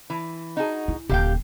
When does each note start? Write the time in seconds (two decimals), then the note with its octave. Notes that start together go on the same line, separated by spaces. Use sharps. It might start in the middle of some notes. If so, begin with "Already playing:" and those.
0.10 E3
0.57 D#4 F#4 G#4
0.88 E4
1.09 D#1 D3 G4 F5 G5